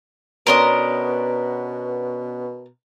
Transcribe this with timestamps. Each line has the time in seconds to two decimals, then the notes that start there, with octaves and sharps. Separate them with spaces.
0.47 B2 B3 C#4 D4 A#4 C6 D#6